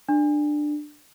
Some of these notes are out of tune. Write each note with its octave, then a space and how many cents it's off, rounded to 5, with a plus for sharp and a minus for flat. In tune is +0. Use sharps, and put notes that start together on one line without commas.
D4 +15